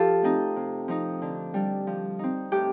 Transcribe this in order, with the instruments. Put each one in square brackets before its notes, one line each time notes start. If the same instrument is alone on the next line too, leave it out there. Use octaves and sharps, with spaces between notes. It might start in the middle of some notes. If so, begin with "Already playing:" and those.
Already playing: [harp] F3 F4 G4 A4
A3 C4 D#4
C3
F3 C4 D#4
D3
G3 D4
F3
C4 D#4
A2 G4